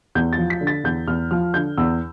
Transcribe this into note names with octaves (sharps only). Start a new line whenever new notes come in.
E2 G6
A6
F3
B6
D3
A6
E2 G6
E2 F6
F3 F6
D3 G6
E2 E6